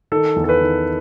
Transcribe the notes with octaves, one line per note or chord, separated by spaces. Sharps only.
D#3 A4
E2
A4
B4
D#3